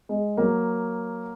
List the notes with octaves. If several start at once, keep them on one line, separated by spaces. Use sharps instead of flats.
G#3
F#3 A#3